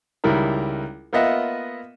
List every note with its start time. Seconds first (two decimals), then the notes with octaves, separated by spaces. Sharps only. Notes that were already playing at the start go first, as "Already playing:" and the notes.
0.24 C#2 D#3 G3 E4 A#4
1.13 A#3 B3 F4 D#5 E5 F#5